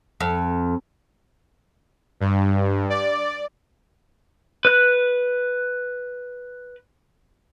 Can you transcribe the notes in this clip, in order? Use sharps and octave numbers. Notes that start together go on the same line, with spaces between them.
F2
G2
D5
B4 F#6